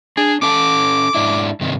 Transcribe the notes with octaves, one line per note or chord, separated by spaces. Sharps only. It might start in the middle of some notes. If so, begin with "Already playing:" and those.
D4 G#4
C#4 A4 A5 D6
G#2 D4 E4
G2 C3 D#3